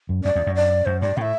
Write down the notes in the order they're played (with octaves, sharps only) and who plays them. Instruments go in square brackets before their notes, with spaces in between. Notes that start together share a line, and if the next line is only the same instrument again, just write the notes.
[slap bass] F#2
[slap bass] F#2 [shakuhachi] D5
[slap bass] E2
F#2
[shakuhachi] D5
[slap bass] F#2 [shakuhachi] C5
[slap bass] G2 [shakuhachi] D5
[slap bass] A2 [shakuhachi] G5
[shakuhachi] E5